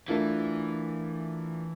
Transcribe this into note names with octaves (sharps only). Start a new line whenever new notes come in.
E3 A3 D4 F4 A#4